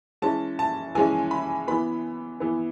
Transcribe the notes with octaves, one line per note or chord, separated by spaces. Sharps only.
E3 G#3 C#4 A5
A5
E3 G#3 C#4 G#5
B5
E3 B3 B5
E3 B3